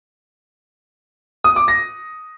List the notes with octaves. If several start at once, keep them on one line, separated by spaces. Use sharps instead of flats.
D#6
D6
A#6